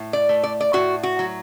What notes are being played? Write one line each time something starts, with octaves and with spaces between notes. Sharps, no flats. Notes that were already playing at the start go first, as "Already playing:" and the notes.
Already playing: A2
D5
A3
D5
D5
A2 F#4
F#4
F#3